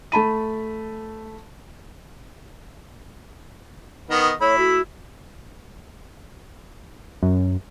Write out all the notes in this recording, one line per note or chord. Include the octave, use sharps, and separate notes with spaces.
A3 A5 B5 D#7
D#3 B3 D#5
A3 E4 C#5 B5
F#4
F#2